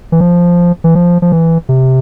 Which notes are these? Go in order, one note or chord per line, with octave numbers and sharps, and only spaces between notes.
E3
F3
E3
F3
F3
E3
C3